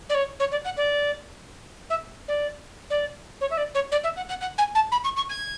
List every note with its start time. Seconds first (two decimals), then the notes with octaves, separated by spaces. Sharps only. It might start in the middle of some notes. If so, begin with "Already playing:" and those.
0.09 D5
0.14 C#5
0.39 C#5
0.51 D5
0.64 F#5
0.77 D5
1.90 E5
2.28 D5
2.90 D5
3.41 C#5
3.50 E5
3.57 D5
3.74 C#5
3.92 D5
4.04 E5
4.16 F#5
4.29 F#5
4.41 F#5
4.58 G#5
4.75 A5
4.92 B5
5.04 C#6
5.16 C#6
5.30 G#6